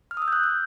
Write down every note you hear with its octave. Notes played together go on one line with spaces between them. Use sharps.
F6
D#6
E6
G6
F#6
G6